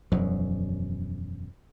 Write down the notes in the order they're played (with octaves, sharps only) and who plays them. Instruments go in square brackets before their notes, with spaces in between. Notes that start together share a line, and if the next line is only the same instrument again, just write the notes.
[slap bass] E1 F#2 F3 F#3